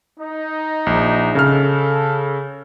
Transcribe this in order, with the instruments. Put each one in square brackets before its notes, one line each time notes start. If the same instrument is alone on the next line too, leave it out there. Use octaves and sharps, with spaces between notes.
[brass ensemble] D#4
[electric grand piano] A#1
[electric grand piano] C#3 F6 [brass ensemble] A4